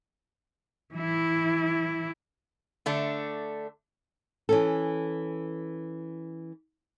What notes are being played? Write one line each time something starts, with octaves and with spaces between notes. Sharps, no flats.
E3 E4
D3 A3 D4
E3 C#4 A4